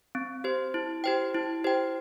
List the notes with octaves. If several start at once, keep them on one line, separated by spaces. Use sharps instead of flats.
C4
G4 C5
E4
G4 C5 G5
E4
G4 C5 G5